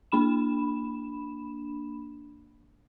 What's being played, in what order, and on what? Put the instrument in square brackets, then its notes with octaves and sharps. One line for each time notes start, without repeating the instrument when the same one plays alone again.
[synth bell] A#3 D4 B5 E7